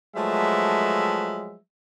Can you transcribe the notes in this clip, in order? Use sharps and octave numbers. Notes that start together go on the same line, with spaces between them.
F3 F#3 G#3 A3 B4 E5